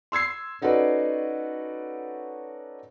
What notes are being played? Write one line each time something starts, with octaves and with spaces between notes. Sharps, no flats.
C6 E6 G#6 C7
C#4 D#4 F#4 A4 B4 D5